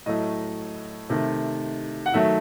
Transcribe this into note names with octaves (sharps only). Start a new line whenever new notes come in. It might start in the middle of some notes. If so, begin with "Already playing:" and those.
A2 F#3 A3 D#5
C3 D#3 A3
F#5
D#3 F#3 A3 E5